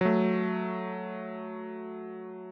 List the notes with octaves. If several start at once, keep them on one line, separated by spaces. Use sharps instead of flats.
F#3 A3